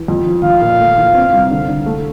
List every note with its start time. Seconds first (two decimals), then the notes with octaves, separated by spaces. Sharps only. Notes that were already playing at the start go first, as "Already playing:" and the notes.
Already playing: E3
0.08 F2
0.26 F3
0.43 F3 F5
0.62 A#2
0.80 A3
0.97 E2
1.15 C4
1.33 C2
1.51 D3
1.68 D3
1.86 A3